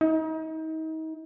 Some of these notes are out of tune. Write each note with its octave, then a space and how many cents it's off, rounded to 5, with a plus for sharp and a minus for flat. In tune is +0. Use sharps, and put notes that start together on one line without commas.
D#4 +35